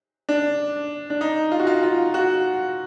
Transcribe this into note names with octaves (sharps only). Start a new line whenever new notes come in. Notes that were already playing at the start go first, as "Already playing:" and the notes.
D4
D4
D#4
F4
F#4
F4
F4
F#4